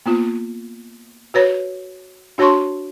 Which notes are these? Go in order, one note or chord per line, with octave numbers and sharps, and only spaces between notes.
A#3 B3 F4
F#4 B4 C#5
D4 F#4 C#5 A5 C6 C#6